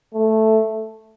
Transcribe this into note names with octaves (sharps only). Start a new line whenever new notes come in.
A3